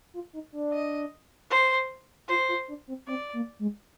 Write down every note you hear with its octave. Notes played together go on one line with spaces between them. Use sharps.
F4
D#4
D4
D#5
C5
F4 C5
F4
D4
C4
C4 D5
A#3
G#3